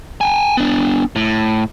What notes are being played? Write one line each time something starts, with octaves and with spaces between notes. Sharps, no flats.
G5 G#5
B3 D4
A2